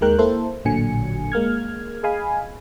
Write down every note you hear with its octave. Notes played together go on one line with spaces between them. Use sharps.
D#2 D#3 G#3 A#4 G5 F#6
A#3 E4 A4 C5
A1 A#2 D3 F#3 G#5 C#7
G#3 A#3 F6 G#6
G#4 D#5 F5 G#5 B5